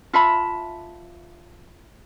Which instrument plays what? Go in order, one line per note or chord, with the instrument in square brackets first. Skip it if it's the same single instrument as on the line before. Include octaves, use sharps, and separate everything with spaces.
[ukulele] F4 E5 A5 B5